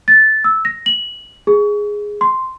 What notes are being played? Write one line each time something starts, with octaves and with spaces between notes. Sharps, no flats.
A6
E6
A#6
F#7
G#4
C6